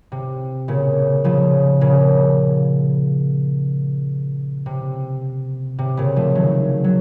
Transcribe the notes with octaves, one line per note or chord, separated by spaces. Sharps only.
C3
A#2 C#3
C#3 F3
A#2 C#3
C3
C3
A#2 C#3
F3 A3
D#3 F#3
F#3